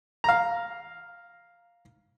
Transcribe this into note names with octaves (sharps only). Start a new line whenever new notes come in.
F5 A#5